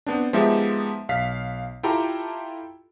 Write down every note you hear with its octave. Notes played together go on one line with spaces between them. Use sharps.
B3 C4 D4
F3 G#3 B3 D#4 G4 E5
B1 F5 B6
E4 F4 G4 A4 G5 A#5